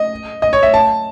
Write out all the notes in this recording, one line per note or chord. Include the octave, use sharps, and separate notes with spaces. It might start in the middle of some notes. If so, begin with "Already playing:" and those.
Already playing: D#5
D#5
C#5
E5
A5